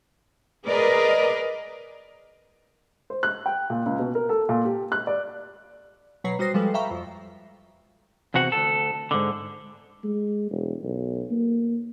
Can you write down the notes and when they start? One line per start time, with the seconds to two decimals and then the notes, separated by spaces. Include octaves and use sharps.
0.66 G#4 A#4 B4 D5 D#5
3.10 C5
3.23 F#6
3.46 G5
3.70 A#2
3.86 C#2
3.99 B2
4.15 A#4
4.29 A4
4.49 A#2
4.65 G4
4.92 F#6
5.07 D5
6.24 B2 F#3 B4 C#5 A#5 C7
6.39 G3 F#4 C5 D#6 A#6 C7
6.54 F3 G3 G#3 A4 B4
6.74 E5 F5 G5 A#5 B5 C#6
6.91 F2 F3
8.34 E2 C3 F#4 F#5
8.52 D2 A4
9.11 G#2 D3
10.04 G#3
10.50 E1
10.83 B1
11.31 A#3